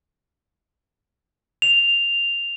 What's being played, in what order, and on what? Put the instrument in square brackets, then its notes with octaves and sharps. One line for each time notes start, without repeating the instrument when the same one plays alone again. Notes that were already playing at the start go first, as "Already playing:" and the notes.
[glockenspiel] F7